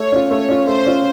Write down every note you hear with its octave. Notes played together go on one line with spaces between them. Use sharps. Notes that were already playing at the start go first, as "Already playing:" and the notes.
Already playing: A3 C#5
C#4 F4
A3 C#5
C#4 F4
A3 C5
C#4 F4